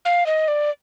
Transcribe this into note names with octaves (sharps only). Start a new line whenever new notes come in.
F5
D#5
D5